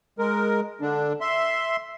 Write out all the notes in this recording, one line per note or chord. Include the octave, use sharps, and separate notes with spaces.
G#3 A#4
D3 D4
E5 C6